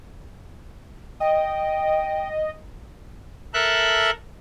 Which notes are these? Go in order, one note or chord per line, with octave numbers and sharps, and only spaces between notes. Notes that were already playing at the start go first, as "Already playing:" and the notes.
D#5 G5
A4 A#4 E5 F#6